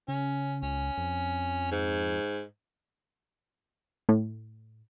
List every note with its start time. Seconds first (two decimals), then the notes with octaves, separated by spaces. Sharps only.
0.08 C#3 C#4
0.63 C#2 C#4
0.98 F2
1.71 G#2
4.09 A2